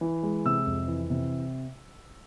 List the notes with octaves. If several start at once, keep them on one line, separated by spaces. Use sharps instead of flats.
E3
G#3
C3 E6
F2
E3
C3